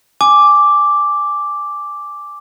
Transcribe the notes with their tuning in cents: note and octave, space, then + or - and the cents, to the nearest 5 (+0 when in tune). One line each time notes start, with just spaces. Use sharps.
G#5 +0 D6 +0